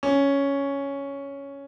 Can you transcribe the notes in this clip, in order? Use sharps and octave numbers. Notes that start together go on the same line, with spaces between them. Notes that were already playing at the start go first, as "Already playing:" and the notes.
C#4